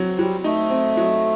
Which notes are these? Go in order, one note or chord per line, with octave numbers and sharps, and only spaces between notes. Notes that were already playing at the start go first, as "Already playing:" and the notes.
Already playing: F#3 C4
F#3 G3
A3 D#4
C4
F#3